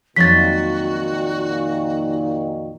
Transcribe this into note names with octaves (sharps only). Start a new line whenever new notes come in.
F2 A#2 D#3 F#3 F#4 A6 B6